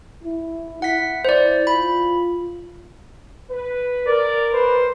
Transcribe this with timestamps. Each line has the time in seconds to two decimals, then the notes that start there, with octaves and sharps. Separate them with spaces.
0.24 E4
0.82 E4 F#5 B6
1.25 C5 D5
1.67 F4 B5
3.50 B4
4.07 A#4 D5
4.53 B4 C5